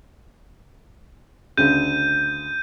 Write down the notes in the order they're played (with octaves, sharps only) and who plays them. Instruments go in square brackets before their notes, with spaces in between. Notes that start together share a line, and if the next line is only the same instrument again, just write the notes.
[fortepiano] D2 C#3 [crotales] G6 D#7